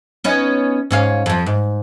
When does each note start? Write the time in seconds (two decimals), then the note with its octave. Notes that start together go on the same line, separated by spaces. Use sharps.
0.24 B3 C#4 D#4
0.91 G#2 C#4 F5
1.26 F2 F3
1.46 G#2